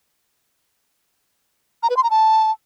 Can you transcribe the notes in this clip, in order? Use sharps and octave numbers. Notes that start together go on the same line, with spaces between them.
A#5
B4
C6
A#5
A5